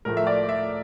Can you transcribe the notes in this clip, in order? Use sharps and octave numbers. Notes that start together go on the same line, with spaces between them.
A2 F3 A3 A#4
E5
D5
E5